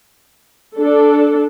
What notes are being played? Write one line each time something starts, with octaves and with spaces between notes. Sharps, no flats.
D4 A4